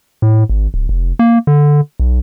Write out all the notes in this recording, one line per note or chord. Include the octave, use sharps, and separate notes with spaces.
A2
G#1
D1
F1
A#3
D3
B1